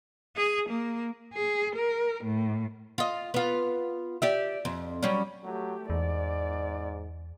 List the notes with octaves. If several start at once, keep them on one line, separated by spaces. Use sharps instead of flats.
G#4
A#3
G#4
A#4
A2
F4 D#5
B3 F4
G4 D5 E5
F2
F#3 G3 C#4
F#3 A3 G4
E2 G#2 D5